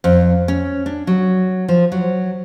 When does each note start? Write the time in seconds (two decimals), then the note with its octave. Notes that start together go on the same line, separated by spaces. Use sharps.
0.04 F2
0.48 C#4
0.86 D4
1.07 F#3
1.68 F3
1.92 F#3